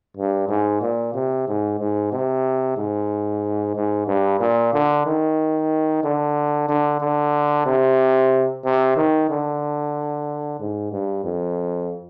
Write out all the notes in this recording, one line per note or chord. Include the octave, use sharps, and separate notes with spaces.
G2
G#2
A#2
C3
G#2
G#2
C3
G#2
G#2
G2
A#2
D3
D#3
D3
D3
D3
C3
C3
D#3
D3
G#2
G2
F2